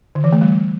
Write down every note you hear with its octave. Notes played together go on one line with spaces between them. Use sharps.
D3
E3
A3
G3